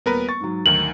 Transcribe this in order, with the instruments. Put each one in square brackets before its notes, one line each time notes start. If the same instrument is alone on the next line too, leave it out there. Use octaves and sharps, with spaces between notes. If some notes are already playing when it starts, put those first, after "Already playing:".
[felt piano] D#1 [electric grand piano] B3 A#4 B4
[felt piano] C#6 [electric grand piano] A6
[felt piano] G#2 F#3
[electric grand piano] D2 D#3 [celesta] F#7